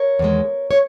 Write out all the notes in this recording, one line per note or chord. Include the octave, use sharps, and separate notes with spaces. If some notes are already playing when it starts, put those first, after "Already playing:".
Already playing: A#4 C#5
E2 D#3 G#3
C#5